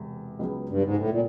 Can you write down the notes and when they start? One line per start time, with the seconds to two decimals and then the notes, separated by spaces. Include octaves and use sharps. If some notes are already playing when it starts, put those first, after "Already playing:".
Already playing: E1 E2 C3
0.39 C#2 C#3 F#3 B3
0.69 G2
0.83 G#2
0.96 A2
1.10 A#2